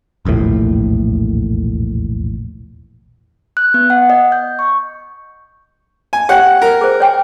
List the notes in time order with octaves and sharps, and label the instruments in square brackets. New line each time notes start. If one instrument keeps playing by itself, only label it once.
[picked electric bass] E1 A#1 D#2 A2
[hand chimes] F#6
B3
F#5
D#5
G6
C#6
[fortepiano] G#5
[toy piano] G4 C#5 G5 [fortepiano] F#5
[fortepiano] A#4
[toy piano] G#4 C5
C#5 G5 G#5